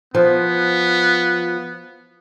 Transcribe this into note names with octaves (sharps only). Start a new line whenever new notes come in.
F3 B3